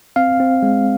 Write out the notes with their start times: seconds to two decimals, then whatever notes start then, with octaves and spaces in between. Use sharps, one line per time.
0.16 C4 F5
0.40 C4
0.63 G#3